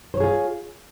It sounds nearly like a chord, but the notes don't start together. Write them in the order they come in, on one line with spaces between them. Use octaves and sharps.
C5 C#5 G#4 F4